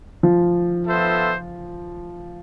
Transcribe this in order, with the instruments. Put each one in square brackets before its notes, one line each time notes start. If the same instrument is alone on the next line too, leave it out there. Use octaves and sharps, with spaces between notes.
[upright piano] F3
[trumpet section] B3 F4 A4 C5 E5